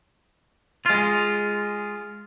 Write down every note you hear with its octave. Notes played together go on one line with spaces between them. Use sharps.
G#3 F4